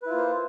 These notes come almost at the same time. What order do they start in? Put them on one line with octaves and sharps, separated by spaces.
B4 E4 F4 A#3 C5